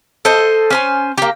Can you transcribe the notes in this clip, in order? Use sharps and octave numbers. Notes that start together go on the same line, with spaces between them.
A4 C5 D#5
C#4 C5 G#5
A#3 G4